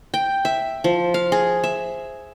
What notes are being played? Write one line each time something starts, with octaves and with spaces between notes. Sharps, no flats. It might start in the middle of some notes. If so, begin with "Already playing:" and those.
G5
E5
F3
F5
G#4
E5